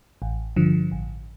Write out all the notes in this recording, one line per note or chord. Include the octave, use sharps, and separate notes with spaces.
A1
G2 D3 F3
A1